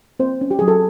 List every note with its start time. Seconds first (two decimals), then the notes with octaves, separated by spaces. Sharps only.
0.20 A#3 C4 C5
0.41 C#4
0.51 G4
0.59 F#3 G#4
0.68 A4